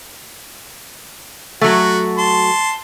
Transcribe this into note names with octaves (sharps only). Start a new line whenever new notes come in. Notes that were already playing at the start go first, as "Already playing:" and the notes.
F#3 A3 F#4
A5 C6